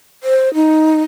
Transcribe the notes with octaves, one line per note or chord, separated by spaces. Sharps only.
C5
D#4